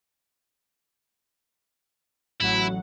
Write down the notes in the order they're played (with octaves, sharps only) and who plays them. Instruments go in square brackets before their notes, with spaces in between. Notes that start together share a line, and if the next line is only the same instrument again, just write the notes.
[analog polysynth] A1 F#3 F#5 [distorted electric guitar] E4